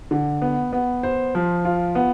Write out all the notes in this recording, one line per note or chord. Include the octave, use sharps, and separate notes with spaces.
D3
B3
B3
C5
F3
F4
B3